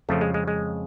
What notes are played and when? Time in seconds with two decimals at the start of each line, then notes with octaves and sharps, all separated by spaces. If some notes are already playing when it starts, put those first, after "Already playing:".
0.09 F2 C#3 F3 A3
0.21 G#3
0.34 G#3
0.48 G#3